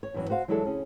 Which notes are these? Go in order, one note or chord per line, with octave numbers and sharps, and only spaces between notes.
C#5
E2 G2 E3 F#3 C#4
F#4 C5 F5 F#5
E3 F#3 G#3 D4 E4 A4
D2 C#4 G#4